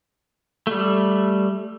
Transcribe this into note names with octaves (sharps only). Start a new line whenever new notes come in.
G3 A3